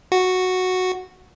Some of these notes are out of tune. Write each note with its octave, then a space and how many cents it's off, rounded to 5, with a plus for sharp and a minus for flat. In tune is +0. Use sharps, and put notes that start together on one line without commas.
F#4 -5